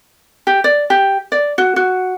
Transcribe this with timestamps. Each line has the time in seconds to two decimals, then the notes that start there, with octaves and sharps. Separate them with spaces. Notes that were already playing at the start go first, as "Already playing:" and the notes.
0.47 G4
0.64 D5
0.90 G4
1.32 D5
1.58 F#4
1.76 F#4